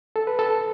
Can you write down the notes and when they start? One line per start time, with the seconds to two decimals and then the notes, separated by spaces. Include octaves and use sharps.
0.16 A4
0.27 B4
0.39 A4